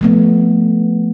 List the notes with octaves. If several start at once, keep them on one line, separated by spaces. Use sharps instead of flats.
F3 A3 B3